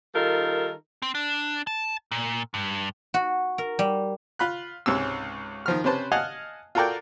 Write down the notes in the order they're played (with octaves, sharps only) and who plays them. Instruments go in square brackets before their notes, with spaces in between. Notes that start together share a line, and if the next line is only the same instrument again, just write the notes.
[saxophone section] D#3 G3 D#4 F4 A4 A#4
[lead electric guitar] C4
D4
A5
A#2
G2
[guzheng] F#4
A#4
G3
[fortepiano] F4 B5 F#6
C#2 G#2 C3 C#4 E6
D#3 F3 F6
C3 C#4 B4 C5 A5
D#5 F5 F#5 G#5 A5 F6
F4 F#4 A4 A#4 D5 G5